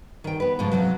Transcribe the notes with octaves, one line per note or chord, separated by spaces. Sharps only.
D#3 G5
B3 B4
G#2 C#3 F3
C3 F3 F#3